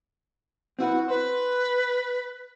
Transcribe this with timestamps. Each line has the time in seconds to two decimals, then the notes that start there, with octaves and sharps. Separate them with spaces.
0.79 C4 E4 F#4 B4
1.08 B4 C5